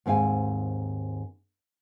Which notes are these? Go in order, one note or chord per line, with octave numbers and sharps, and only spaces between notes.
D#2 G#2 C4 F5 G#5